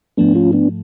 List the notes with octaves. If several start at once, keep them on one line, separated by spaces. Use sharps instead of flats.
G#2 F3 A3 B3 D4
C#4 F4
B3 D4